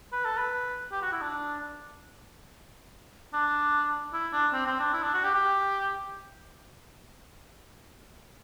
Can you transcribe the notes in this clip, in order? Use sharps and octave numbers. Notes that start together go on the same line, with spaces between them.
B4
A4
B4
G4
F#4
E4
D4
D4
E4
D4
C4
C4
D4
E4
D4
F#4
G4
G4